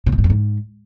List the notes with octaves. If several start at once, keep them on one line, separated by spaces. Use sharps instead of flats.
B2
A#2
G#2
F2
G#2